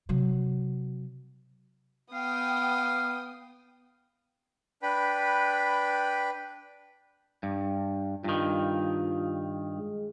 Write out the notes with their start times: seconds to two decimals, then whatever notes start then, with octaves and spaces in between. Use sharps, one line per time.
0.09 C3 F#3
2.13 B3 F5 G5 D#6
4.83 D4 B4 G5 B5
7.43 G2
8.24 G2 D#3 F4
9.77 G#3